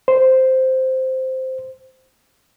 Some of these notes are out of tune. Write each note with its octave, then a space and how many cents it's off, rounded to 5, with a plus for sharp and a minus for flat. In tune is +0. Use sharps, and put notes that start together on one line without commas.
C5 -5